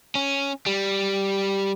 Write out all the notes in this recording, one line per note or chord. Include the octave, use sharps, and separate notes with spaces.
C#4
G3